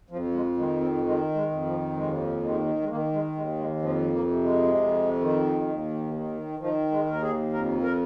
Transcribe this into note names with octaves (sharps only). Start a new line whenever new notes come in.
F2 F3
G#3
D#3 G#3
C4
D#3 G#3
G#3
F2
F3
D#2 G#3
D#3 G#3
G#3
D#3 A#3
G#3
D#2 G#3
G#3
F2 F3
A#3
C3
G#3
F2
D#3
D#2
D#3
D#3 F3
G#3
D#2
A#4
G#4
F2 A#4
A#4